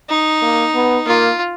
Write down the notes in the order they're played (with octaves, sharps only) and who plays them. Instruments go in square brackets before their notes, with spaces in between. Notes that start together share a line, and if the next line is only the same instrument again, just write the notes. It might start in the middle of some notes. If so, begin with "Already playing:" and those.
[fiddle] D#4
[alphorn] A#3
B3
[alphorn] A#3 [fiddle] F4